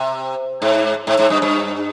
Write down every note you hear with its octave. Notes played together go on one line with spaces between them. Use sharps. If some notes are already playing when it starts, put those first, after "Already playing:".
Already playing: C3
G#2
G#2
G#2
G2
G2